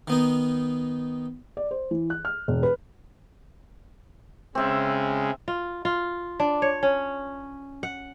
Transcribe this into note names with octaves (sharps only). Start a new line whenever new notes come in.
D#3 B3 D#4
D5
C5
E3
F#6
F6
E1
B4
C#3 G#3 C4 E5
F4
F4
D4
C#5
C#4
F#5